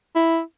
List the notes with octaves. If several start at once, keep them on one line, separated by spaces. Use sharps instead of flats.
E4